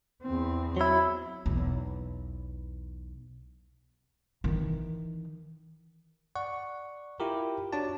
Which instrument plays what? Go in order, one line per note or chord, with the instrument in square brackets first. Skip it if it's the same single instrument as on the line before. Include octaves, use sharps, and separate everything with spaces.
[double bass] E2 C4
[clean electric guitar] F#3 E4
[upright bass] B1 E2
D#3 E3
[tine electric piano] D5 F#5 C#6
E4 F4 G4 A#4
D4 F#4 C#5 D5 A5